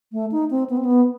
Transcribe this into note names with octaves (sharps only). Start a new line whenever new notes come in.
A3
D#4
C4
B3
C4
B3